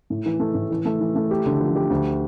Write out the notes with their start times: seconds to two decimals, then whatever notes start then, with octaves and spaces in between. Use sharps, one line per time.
0.10 A2
0.26 E3
0.40 A3
0.55 A2
0.71 E3
0.85 A3
1.01 E3
1.15 A3
1.31 G4
1.46 D3
1.60 F3
1.75 G4
1.90 D2